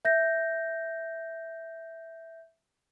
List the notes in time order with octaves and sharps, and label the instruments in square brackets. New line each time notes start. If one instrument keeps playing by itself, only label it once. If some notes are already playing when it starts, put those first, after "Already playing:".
[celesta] E5 G6 A#6